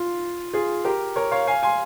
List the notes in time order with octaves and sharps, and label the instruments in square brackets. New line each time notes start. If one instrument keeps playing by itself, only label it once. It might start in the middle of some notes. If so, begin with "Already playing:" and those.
Already playing: [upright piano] F4
F4 G#4
G4 A#4
A#4 C#5
C#5 F5
F5 G#5
G#5 C6